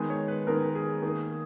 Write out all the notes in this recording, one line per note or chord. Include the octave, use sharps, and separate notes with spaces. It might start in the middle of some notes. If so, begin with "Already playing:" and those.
Already playing: D#3 G#3 B3 G#5
C#5
B4
D#3 G#3 B3 A#4
G#4
D#3 A#3